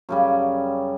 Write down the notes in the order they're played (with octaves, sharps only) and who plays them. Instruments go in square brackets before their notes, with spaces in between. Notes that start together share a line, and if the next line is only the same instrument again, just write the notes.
[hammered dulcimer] F#2 C#3 G3